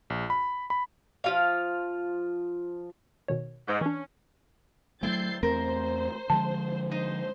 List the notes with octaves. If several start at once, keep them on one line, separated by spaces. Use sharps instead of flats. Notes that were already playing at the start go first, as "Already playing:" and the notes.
A#1
B5
B5
F3 F4 F5
B2 D#3 C#5
G#2 G6
E3 C#4 D4
F#3 G#3 A3 C4 E4 G6 A6 C7
E2 A3 C4 A#4 C5
D3 F3 G#3 A5
D#4 C5